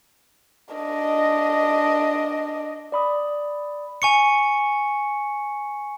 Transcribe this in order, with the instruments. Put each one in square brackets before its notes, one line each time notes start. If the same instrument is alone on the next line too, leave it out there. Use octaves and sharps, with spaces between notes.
[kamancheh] D4 D#5
[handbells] D5 B5 D#6
[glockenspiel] G#5 C#6 C#7